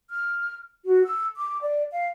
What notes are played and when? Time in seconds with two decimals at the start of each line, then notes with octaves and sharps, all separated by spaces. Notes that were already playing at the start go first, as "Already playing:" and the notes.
0.10 F6
0.85 F#4
1.04 E6
1.37 D6
1.61 D5
1.92 F5